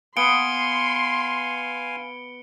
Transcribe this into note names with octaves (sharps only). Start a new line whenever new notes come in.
B3 F5 G#5 C6 C#7 D7 G7